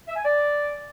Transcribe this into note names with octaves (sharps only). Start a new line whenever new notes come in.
E5
G#5
D5